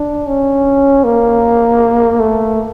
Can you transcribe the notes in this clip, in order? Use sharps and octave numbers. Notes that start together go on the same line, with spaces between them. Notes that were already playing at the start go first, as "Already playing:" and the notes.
Already playing: D4
C#4
A#3
A3